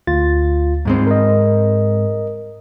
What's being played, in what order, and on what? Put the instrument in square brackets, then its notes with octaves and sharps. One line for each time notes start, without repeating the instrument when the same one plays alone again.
[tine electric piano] D2 F4 A6
[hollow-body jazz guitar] G#2 G#3 C4
[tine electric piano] A#4 D#5